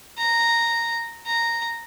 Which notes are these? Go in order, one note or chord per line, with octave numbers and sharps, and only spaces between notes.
A#5
A#5